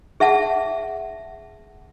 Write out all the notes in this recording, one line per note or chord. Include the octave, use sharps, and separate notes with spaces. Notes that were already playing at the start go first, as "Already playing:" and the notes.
G#4 E5 F#5 A5